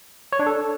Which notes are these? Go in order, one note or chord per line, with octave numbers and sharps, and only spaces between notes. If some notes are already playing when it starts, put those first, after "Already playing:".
C#5
D4
A4